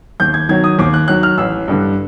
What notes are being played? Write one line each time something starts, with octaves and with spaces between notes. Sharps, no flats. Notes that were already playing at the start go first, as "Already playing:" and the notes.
D#2 G6
G#6
D#3 F#3 G#6
D#6
D#2 D6
F#6
D#3 F#3 F#6
F6
A1 E6
G2 D3